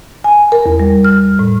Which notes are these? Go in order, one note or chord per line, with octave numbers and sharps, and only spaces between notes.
G#5
A#4
E2
G3
F6
A2